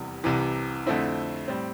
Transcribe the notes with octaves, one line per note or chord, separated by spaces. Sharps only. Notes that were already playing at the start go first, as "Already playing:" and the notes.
Already playing: F1 E2 C3 E3 G3
C2 C3 E3
F2 D3 A3 C4 E4
A2 G3 C4